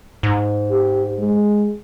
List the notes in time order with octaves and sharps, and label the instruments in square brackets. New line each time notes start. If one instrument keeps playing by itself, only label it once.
[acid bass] G#2
[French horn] G4
G#3